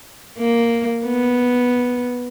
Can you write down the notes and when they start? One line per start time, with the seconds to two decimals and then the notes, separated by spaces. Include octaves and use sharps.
0.38 A#3
1.06 B3